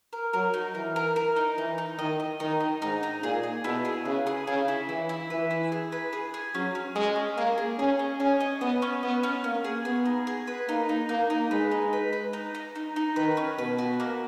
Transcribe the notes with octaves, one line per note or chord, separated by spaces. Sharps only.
A#4
F#3 A#4
D#4
E3 A#4
A#4
A#4
D#4
E3 D#4
D#4
D#3 D#5
D#5
D#3 D#4
D#5
G#2 D#4
D#4
A#2 G#4
G#4
B2 E4
G#4
C#3 B4
G#4
C#3 G#4
E4
E3 E4
E4
E3 B4
E4
G#4
B4
G#4
G#4
F#3 C#4
C#4
G#3 D#5
C#4
A#3 G#4
G#4
C#4 G#4
D#5
C#4 G#4
D#5
B3 D#5
C#4
B3 D#5
C#4
A#3 C#4
G#4
B3 G#4
D#4
G#4
B4
A#3 D#4
D#4
A#3 D#4
D#4
G#3 B4
D#4
B4
B4
D#4
D#4
D#4
D#4
D#3 B4
C#4
B2 B4
F#4
A#3